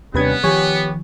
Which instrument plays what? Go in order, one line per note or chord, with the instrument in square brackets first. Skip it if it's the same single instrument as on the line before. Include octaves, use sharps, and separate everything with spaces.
[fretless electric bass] D#2 D4 [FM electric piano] C3 B4 G#6 [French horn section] G3 C#4 [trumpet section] B3
[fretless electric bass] D#3 F3 [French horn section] G4 [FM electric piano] C#5 G#5